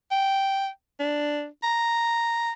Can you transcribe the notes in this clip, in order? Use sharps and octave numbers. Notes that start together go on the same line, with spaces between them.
G5
D4
A#5